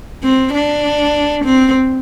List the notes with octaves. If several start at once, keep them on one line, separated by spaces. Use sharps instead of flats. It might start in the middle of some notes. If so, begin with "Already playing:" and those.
C4
D4
C4